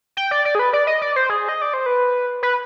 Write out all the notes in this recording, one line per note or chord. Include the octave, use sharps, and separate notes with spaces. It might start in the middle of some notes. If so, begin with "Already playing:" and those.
G5
D5
D5
G#4
B4
D5
D#5
D5
C5
G#4
D#5
D5
C5
B4
B4